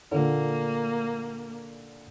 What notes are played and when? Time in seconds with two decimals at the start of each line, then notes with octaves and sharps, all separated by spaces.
0.12 A#2 D3 A#3